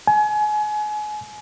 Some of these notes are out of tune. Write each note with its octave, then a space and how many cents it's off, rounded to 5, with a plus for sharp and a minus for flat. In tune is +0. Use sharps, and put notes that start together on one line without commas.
G#5 +30